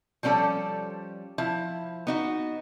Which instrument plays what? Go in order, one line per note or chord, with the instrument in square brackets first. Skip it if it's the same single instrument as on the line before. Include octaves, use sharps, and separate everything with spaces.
[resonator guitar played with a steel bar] F3 G3 C#4 D4 A4 D5
F3 E4
B3 D#4 F#4